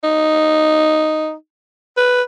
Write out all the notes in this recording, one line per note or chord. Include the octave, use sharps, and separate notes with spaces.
D#4
B4